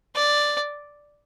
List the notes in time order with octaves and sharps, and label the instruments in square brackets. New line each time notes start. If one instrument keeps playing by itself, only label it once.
[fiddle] D5